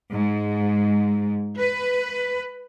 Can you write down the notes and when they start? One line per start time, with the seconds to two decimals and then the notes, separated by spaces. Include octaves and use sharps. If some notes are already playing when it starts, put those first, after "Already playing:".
0.11 G#2
1.58 B4